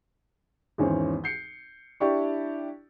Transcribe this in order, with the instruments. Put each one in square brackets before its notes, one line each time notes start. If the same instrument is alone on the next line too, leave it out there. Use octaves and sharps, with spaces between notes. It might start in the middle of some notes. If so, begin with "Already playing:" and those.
[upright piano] G#1 E2 C#4 C5
G6 C7 C#7
D4 E4 G4 D5 C#6